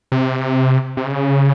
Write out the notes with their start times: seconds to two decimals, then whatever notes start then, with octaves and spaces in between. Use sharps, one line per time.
0.12 C3
0.97 C3
1.06 C#3